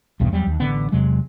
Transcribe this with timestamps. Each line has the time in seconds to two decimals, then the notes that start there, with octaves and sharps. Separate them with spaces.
0.20 B1 E2 G2 B2
0.32 E2 F#3 G3
0.47 D#2
0.60 A1 D3 B3
0.92 E2 C3 F#3 G#3